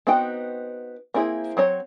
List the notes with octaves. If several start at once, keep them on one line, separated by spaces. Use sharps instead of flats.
B3 C4 D#4 F#4 G5
A#3 C4 E4 G#4
F#3 C4 C#5